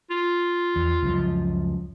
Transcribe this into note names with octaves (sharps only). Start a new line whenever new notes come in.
F4
E2
C#2 F#2 F3